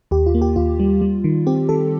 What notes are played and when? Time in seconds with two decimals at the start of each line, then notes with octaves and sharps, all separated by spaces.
0.11 D#2 G4
0.26 F4
0.34 A#3
0.42 G4
0.56 D#2 F4
0.80 G3
1.01 G3
1.24 D#3
1.47 C4 G4
1.69 D#3 A4